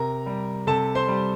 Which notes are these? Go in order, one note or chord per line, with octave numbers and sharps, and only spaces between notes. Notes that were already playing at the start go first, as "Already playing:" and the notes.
Already playing: C3 A#4 A#5
G3
C3 A4 A5
C5 C6
G3